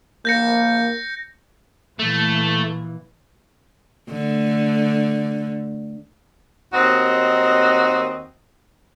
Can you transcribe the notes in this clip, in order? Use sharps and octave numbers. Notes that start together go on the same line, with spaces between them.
A#3 G6 A#6 C#7
A#2 E3 A3
D3 A3
D#2 C4 D#4 F#4 D#5